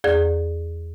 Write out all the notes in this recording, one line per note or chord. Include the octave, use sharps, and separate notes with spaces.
E2 G#4 D5 G#6